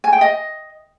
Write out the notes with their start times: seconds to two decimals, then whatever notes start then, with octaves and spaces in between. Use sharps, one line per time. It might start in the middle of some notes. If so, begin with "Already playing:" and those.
0.04 G#5
0.13 G5
0.21 D#5